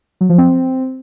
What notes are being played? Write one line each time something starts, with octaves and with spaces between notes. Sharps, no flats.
F#3
F3
C4